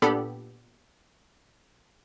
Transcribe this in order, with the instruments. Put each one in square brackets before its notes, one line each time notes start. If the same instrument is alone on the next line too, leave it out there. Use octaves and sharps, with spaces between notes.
[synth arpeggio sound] A#2 B3 D4 G4 A4 B5